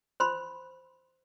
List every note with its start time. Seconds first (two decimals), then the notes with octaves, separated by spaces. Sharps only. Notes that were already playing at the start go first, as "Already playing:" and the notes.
0.20 C5 B5 C6